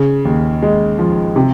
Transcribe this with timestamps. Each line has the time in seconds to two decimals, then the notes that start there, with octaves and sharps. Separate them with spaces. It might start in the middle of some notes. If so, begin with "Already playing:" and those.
Already playing: C#3
0.25 D#2
0.62 G#3
0.99 F3
1.36 C3